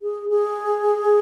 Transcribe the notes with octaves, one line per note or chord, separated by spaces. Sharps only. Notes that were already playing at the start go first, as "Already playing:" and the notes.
G#4
G#4